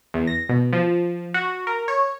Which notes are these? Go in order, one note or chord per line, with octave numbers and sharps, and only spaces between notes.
E2
A#6
B2
F3
F#4
A#4
C#5